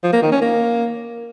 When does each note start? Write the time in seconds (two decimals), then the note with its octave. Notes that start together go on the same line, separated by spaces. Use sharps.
0.03 F3
0.13 A#3
0.22 D#3
0.32 C#4
0.41 A#3